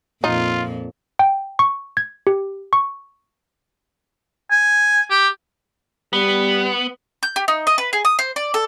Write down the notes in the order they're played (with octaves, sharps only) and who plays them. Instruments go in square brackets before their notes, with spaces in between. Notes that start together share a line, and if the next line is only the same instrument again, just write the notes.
[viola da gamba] F2 A#2 F3 [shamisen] D#4 [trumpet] F4
[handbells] G5
C#6
G#6
G4
C#6
[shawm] G#5
G4
[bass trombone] G3 [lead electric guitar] B3
[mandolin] G6
G4
D#4
D#5
B4
G#4
D#6
C5
D5
A4